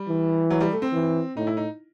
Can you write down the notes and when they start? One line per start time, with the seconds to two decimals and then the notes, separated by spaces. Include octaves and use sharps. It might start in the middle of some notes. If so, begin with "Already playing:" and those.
Already playing: G3
0.08 E3
0.50 F#3
0.61 G3
0.72 A3
0.82 C4
0.93 E3
1.36 A2 D#4
1.47 E4
1.57 D#4